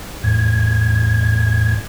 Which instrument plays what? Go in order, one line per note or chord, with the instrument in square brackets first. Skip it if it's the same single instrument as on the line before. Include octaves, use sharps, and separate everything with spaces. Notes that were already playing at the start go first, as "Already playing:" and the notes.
[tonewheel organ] E2 A2 G#6